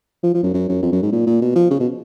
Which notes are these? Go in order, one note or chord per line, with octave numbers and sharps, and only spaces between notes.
F3
F3
F#2
F#2
F#2
F2
F#2
G#2
A#2
A#2
B2
F3
C#3
B2